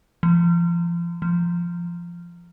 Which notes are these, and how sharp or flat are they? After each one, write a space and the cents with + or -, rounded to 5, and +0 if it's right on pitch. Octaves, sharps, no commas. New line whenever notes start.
F3 -35
F3 -15